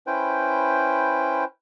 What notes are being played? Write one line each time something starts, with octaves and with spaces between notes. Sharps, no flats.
C#4 E4 B4 C5 G5